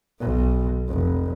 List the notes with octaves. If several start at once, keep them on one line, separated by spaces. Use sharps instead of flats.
B1
F1